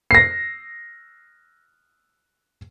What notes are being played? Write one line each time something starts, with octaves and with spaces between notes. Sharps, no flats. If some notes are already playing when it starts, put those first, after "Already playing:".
A#6 C7